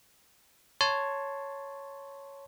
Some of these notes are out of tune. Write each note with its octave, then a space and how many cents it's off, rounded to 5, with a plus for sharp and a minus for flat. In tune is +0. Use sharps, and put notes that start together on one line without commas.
C#5 +0 A5 +0 C6 +0